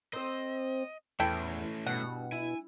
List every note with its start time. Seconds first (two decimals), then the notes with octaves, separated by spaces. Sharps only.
0.13 C4 C5 D#5
1.20 E2 E3 A3 C#4 E4 A4 G5
1.86 G2 B2 G3 F#5
2.32 E4 G#5